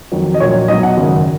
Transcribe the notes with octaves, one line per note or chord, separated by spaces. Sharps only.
F2 D#3 F#3
D#5
A#1 A#2 F#3 C#5
B1 B2 F#3 D#5
F#5
G#1 F#2 C#3